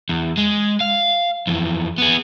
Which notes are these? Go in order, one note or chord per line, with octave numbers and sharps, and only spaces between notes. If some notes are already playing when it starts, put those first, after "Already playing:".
E2
G#3
F5
F2 E3
B3 G#4